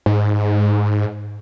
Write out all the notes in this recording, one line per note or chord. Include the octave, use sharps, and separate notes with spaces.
G#2